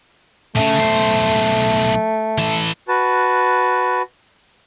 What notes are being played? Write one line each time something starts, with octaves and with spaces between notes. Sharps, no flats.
A#2 C#3 A3
B1 C5
E3 A4
F#4 B4 A5